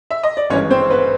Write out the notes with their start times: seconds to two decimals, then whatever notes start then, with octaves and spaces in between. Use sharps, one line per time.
0.11 E5
0.23 D#5
0.37 D5
0.50 G#1 G2 E3 G#3 C#4 C#5
0.70 C4 C5
0.90 B3 B4